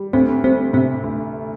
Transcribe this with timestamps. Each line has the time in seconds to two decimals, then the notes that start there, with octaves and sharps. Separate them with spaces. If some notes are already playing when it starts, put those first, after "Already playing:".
Already playing: G3
0.13 D2 C4
0.44 G3 C4
0.73 C3 C4
1.04 D2